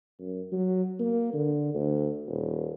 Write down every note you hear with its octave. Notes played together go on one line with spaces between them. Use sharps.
F#2
F#3
A#3
D3
D2
D#1